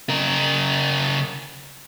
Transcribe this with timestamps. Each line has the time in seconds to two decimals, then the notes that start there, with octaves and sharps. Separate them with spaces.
0.09 C#3 A#4